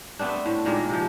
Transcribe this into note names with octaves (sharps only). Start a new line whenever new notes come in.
A3 B3 C4 D4
A2
A#2 D#3 G#3 A#3
C3 F3